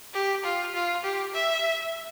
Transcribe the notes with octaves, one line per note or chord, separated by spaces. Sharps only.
G4
F4
F4
G4
E5